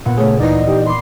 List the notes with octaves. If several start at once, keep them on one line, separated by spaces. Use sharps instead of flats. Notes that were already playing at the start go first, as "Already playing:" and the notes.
A#2 B3 F#5
C#3 A3 G#4 C#5
D2 E3 D#4 D5 D#5 C7
E3 D#4 G4
B5 C6 D6